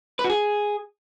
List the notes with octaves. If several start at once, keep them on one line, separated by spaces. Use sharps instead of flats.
B4
F#4
G#4